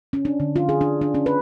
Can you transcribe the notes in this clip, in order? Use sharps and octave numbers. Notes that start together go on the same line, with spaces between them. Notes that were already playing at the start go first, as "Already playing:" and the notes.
C#4
D4
D3
F4
G#4
D4
D4
C#4
B4